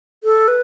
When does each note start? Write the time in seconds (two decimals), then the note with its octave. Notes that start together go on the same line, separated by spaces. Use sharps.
0.24 A4
0.48 B4